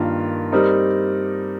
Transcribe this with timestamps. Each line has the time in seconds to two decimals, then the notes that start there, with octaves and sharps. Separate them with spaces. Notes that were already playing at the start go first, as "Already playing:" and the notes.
Already playing: G2 D#3 A#3 F4 A#4
0.52 G3 C4 D#4 A#4